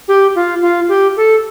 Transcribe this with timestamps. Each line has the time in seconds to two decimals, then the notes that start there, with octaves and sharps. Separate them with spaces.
0.08 G4
0.35 F4
0.62 F4
0.89 G4
1.17 A4